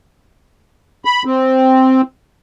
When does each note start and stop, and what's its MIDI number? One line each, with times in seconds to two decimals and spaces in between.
1.05 1.23 83
1.25 2.01 60